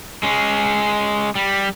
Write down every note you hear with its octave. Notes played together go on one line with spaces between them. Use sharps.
G#3 C#4
G3